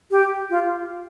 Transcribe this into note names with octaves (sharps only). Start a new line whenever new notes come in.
G4
F4